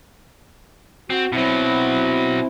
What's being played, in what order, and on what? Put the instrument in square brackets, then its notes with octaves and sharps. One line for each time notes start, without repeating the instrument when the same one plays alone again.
[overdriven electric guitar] C4 [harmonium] F#4
[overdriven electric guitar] B2 F#3 [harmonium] C4 E4